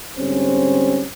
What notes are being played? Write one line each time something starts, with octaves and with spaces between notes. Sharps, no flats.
G#2 D3 G3 C4 C#4 C5